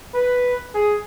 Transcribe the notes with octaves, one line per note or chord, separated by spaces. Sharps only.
B4
G#4